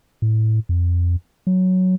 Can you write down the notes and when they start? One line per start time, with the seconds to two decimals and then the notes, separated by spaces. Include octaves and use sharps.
0.22 A2
0.69 F2
1.47 F#3